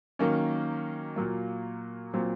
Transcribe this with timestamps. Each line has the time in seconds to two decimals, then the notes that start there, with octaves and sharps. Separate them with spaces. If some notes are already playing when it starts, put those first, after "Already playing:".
0.19 D#3 F#3 A#3 C#4
1.16 A#2 F#3 A#3
2.14 A#2 F#3 C4